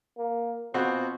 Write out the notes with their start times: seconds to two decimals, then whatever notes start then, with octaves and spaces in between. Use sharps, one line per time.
0.17 A#3
0.74 B2 F3 C4 F#4